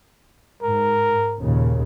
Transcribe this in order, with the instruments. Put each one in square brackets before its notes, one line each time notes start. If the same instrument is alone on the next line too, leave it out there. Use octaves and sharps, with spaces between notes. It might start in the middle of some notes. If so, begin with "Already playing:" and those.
[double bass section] G#2 [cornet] A#4
[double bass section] D#2 A#2 C#3